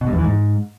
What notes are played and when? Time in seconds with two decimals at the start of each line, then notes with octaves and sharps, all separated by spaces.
0.01 B2
0.07 G2
0.13 E2
0.18 E3
0.24 G#2